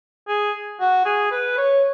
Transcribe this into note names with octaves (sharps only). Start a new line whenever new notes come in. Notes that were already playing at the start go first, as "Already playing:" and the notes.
G#4
F#4
G#4
B4
C#5